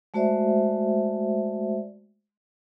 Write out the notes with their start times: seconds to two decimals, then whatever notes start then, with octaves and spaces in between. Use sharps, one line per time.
0.14 G#3 A3 F#4 C5 D5 E5